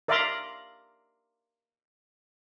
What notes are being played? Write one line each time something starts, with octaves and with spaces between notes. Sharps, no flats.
A#4 D5 E5 F5 A#5 C6